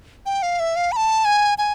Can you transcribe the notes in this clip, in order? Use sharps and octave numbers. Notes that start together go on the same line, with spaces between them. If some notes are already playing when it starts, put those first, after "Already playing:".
G5
F5
E5
F5
B5
A5
G#5
G#5